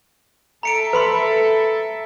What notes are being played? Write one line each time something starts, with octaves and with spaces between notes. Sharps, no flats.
A4 E5 A#5 C#7 D7
B4 B5 C6